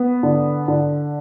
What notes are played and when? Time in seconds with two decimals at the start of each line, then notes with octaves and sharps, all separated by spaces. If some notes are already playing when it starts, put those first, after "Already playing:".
Already playing: B3
0.23 D3
0.68 D3